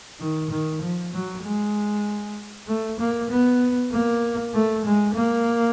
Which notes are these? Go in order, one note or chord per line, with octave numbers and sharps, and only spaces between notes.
D#3
D#3
F3
F#3
G#3
A3
A#3
B3
A#3
A3
G#3
A#3